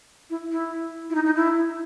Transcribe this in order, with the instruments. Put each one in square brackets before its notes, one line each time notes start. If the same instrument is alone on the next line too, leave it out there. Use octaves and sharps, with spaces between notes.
[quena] E4
E4
E4
D#4
D#4
E4